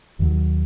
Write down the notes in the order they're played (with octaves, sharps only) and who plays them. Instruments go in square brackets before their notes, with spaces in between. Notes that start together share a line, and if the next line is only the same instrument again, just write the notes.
[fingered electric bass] D#2 D#3 F#3